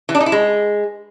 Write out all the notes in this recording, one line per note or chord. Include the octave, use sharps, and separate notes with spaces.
E3
D4
D#4
E4
G#3